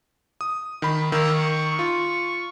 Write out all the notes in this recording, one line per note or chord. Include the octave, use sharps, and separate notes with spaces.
D#6
D#3 B5
D#3 A#3 A#4 E6
C#6
F4